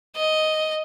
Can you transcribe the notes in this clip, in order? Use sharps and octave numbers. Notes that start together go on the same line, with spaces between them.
D#5